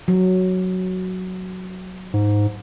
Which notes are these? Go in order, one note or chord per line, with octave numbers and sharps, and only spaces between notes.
F#3
G#2